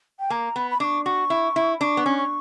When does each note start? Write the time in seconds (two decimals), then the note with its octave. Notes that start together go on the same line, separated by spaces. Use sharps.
0.20 G5
0.30 A#3 A#5
0.56 B3 B5
0.71 B5
0.80 D4 D6
0.84 C#6
1.05 F#4 C#6
1.30 E4
1.56 E4
1.81 D4 C#6 D6
1.97 B3
2.06 C#4
2.18 C#6